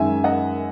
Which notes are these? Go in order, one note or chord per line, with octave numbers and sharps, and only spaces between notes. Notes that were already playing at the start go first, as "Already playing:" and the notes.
Already playing: F#2 D#3 G#3 E5 G#5
D#5 F#5